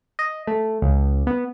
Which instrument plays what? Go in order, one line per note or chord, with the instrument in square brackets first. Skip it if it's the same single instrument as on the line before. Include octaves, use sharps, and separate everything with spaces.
[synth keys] D#5
A3
C#2
B3